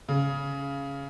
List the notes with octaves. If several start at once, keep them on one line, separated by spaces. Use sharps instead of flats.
C#3